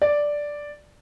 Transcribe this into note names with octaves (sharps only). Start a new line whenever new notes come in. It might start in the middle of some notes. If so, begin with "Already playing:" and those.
D5